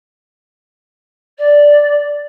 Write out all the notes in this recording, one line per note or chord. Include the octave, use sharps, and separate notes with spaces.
D5